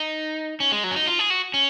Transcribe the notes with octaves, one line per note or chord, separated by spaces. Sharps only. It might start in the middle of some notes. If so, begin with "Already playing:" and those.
Already playing: D#4
C#4
G#3
F#3
C#4
D#4
F4
G#4
F#4
C#4